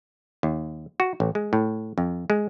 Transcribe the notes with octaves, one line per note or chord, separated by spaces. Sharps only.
D#2
F#4
A1
G#3
A2
F2
G#3